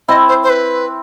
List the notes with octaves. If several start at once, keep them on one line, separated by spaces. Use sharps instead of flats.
C4 E4 D#5
C5
C5
B4